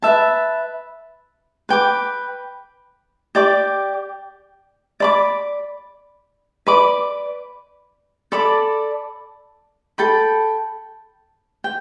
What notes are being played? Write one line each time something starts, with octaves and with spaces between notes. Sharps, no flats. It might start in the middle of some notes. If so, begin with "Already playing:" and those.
B4 E5 A5
B4 G5 D6
G4 D5 G5 D6
D5 B5 D6
B4 D5 B5 D6
A4 D5 B5 D6
A4 G5 B5
G5